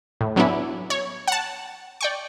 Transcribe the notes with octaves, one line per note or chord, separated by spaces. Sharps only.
A2
F#3 B3 C#4 D4 E4
C#5
F#5 A5
D5 G5 C#6